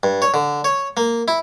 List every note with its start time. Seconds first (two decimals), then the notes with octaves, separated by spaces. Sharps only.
0.03 G2
0.22 C#5
0.34 D3
0.64 C#5
0.97 A#3
1.28 E4